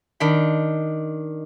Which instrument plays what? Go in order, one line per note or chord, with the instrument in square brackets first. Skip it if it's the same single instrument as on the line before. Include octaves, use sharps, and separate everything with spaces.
[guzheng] D#3 D4 B5